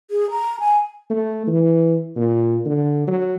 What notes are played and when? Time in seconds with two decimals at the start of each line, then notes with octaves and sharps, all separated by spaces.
0.11 G#4
0.31 A#5
0.60 G#5
1.10 A3
1.47 E3
2.16 A#2
2.66 D3
3.08 F#3